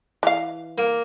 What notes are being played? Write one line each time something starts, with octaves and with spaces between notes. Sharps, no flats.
E3 F5
A#3